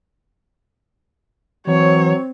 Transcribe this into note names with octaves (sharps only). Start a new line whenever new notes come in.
E3 F#3 C4 C#5